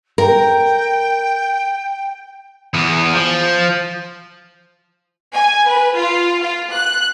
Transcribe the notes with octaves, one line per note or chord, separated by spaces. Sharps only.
A#4 G5
E2 B3
F3
G#5
B4
F4
F4
F#6